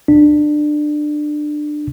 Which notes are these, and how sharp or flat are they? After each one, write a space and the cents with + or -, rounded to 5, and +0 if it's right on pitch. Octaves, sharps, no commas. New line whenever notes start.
D4 +20